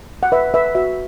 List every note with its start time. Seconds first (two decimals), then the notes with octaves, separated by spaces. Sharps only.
0.23 F#5
0.32 B4 E5
0.54 B4 E5
0.75 F#4 E5